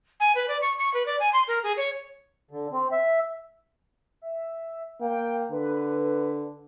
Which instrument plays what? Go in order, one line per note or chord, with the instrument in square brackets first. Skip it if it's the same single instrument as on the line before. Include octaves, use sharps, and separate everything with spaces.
[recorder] G#5
B4
D5
C#6
C#6
B4
D5
G#5
C6
A#4
G#4
C#5
[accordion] D3
C4
E5
[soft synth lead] E5
[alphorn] A#3 [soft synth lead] G5
[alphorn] D3 [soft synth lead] B4